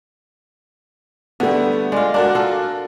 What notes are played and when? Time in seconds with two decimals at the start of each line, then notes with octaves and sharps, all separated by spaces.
1.40 D3 G3 A3 B3
1.92 G#3 F4 D5
2.14 D4 F#4 A#4 D5
2.35 F4 A4